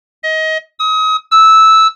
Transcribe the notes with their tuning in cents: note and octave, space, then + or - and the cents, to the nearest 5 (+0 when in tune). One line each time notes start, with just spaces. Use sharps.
D#5 +25
D#6 +35
E6 -10